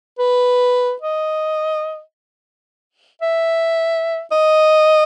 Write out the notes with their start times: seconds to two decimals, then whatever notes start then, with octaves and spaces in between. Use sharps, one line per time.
0.19 B4
1.01 D#5
3.22 E5
4.32 D#5